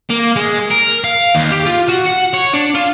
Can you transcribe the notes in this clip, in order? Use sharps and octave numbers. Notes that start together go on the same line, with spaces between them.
A#3
G#3
A#4
F5
D#2
G4
F4
F#4
F#5
C#5
D4
F4